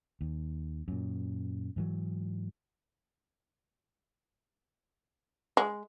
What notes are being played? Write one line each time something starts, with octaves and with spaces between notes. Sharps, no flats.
D#2
F#2 A#2
G#2 E3 F#3
G#3